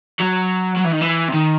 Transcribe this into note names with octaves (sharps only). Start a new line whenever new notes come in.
F#3
F#3
E3
D#3
E3
C3
D#3